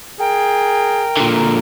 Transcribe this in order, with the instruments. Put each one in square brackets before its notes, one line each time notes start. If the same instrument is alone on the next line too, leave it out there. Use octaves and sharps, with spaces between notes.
[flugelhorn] G#4 [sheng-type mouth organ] A#4 [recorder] G5
[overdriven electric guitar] A#2 D3